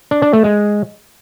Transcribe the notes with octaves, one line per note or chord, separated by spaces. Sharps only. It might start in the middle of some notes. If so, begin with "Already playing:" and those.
D4
D4
A3
G#3